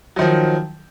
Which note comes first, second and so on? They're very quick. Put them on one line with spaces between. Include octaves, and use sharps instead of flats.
F#3 D#3 F3